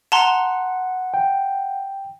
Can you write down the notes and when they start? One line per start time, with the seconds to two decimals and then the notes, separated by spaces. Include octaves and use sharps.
0.12 F#5 A5 A#5 C6
1.14 G5